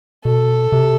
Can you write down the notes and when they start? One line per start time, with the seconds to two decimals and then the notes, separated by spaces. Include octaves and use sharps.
0.25 B2 A4
0.72 C3